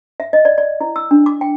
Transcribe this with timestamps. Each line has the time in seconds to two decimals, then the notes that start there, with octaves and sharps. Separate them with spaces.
0.20 E5
0.33 D#5
0.45 D5
0.58 D5
0.81 E4
0.96 E6
1.11 D4
1.26 D6
1.41 G5